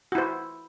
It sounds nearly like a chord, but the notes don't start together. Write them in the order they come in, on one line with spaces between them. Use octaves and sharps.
F#4 E4 C5